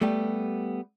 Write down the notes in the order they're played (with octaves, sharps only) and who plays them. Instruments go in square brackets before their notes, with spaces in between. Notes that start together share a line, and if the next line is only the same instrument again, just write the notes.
[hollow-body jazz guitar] G3 A3 B3 G4